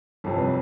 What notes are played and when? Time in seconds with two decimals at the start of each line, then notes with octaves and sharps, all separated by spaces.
0.24 G1 F2 C3 A4
0.38 B4